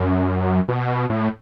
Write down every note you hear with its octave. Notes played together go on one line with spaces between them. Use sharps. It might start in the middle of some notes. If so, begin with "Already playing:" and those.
Already playing: F#2
B2
A2